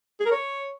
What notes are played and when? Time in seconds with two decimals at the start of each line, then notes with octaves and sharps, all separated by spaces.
0.20 G#4
0.26 A#4
0.32 C#5